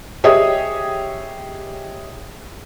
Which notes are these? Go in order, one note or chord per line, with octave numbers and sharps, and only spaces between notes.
G4 G#4 C#5 D#5 E5 D#6